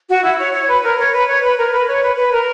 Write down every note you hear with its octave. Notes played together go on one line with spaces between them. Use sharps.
F#4
E4
C#5
C#5
B4
A#4
C#5
B4
C#5
B4
A#4
B4
C#5
B4
B4
A#4